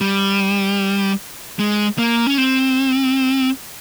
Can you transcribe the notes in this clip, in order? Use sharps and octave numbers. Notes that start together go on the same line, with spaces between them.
G3
G#3
A#3
C#4
C4